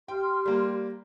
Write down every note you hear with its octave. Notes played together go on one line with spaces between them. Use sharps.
G4 G5 C6 F6
G3 A#3